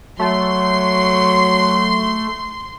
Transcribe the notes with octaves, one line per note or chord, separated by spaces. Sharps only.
F#3 A3 C6